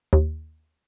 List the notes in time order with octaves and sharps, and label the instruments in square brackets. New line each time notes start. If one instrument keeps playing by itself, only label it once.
[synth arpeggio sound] D#2